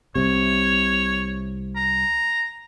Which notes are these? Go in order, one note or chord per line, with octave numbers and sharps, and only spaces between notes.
C2 C3 C#5
A#5